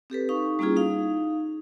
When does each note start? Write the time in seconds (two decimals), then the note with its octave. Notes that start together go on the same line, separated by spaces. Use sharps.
0.10 C4 G4 A4 B4
0.29 D#4 F5 C#6
0.59 G3 A#3 C#4 E4 F4 G#4
0.76 D#4 F5